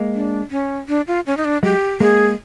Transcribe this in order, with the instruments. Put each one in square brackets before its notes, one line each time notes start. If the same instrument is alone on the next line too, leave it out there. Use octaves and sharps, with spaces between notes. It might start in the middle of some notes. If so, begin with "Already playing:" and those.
Already playing: [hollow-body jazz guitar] G#3 A#3
[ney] D4
C#4
D4
F4
C#4
D#4
D4
[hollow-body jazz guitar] F#3 G#3 [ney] G4
[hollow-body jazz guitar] G#3 A#3 [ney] G#4